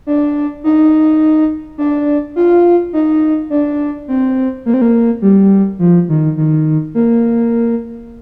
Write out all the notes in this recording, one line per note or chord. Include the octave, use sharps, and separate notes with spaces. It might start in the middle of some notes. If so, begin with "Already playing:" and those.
D4
D#4
D4
F4
D#4
D4
C4
A#3
C4
A#3
G3
F3
D#3
D#3
A#3